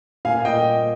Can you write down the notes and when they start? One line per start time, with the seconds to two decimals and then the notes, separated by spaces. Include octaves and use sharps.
0.25 A#2 F5 G#5
0.45 A#2 D#5 G5